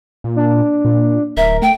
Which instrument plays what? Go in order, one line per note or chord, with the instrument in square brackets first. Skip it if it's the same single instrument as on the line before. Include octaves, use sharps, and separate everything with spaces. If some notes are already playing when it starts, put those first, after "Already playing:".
[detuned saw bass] A#2
[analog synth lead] D4
[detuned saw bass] A#2
[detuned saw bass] D1 [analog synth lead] A#4 [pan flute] E5
[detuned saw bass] A3 [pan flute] G5